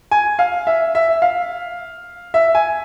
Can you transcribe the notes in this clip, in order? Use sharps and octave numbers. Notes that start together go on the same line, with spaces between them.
G#5
F5
E5
E5
F5
E5
G#5